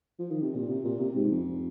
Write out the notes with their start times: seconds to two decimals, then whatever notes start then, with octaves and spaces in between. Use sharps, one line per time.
0.19 F3
0.30 D#3
0.42 C3
0.54 A#2
0.69 C3
0.85 A#2
1.00 C3
1.16 G#2
1.31 F2